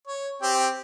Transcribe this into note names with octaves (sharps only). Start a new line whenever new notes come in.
C#5
C4 G4 G5